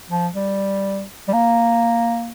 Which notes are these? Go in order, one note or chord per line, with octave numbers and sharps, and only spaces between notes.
F3
G3
G3
A#3